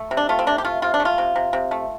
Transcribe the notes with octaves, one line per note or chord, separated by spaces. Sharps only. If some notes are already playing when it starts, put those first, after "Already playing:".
Already playing: A3
C3
D4
A3 F4
C4
C3 D4
G4
A3 F4
C3 F4
D4
A3
F4
C3
C3
C3
A3